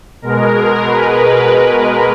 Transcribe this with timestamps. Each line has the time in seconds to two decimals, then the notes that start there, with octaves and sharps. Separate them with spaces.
0.22 B2 G#3 A#4
0.84 B4